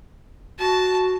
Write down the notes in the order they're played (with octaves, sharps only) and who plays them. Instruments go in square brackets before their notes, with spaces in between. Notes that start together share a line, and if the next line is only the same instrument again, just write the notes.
[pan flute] F#4 [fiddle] A5